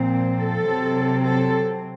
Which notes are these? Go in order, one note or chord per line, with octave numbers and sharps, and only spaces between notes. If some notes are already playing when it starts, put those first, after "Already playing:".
Already playing: A#2 F3 C4
A4
C3 F#3 C4
A4